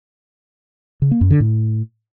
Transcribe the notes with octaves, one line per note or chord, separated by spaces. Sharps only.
C#3
A#3
F#2
D3
A2